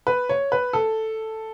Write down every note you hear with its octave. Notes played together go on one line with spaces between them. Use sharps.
B4
C#5
B4
A4